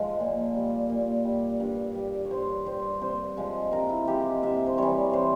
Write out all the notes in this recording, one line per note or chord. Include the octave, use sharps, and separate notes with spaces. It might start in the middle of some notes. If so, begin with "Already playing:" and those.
Already playing: G#2 F3 G#3
A#2
G3
A#2
G3
G2
G3
C#5
G2 C5
G3 C5
C3 C5
F3 G#3
C3 A#4
E4
F3 G#3 G4
C3 E5
C5
E3 G3 C#5
C3 C5